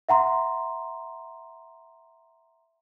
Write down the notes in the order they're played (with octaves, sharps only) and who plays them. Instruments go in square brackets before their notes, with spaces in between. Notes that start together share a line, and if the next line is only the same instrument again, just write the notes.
[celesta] E5 F#5 A#5 C6